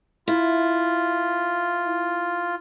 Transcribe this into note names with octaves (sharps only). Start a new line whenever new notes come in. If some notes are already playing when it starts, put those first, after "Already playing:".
E4 F4